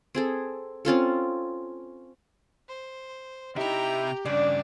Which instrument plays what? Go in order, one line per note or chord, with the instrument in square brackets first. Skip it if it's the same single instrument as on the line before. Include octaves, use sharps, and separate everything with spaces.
[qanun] C4 G#4 A4
C4 C#4 F4 A4
[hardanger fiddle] C5
[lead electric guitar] C3 E5 [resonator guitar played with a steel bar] D#4 E4 [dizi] G4 [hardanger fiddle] G5 A#5
[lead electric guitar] G2 C#3 [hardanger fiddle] D4 [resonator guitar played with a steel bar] D5